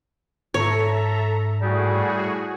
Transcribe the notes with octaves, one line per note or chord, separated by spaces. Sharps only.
G#2 A4 C#5 E5 A#5
A2 G3 F#4 G#4